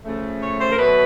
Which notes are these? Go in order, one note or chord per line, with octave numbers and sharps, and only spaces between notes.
C#3 F3 A3
C#5
C5
A#4
B2 F#3 A3 B4